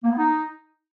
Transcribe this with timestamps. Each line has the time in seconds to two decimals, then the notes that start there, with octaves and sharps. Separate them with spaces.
0.04 A#3
0.11 B3
0.18 D#4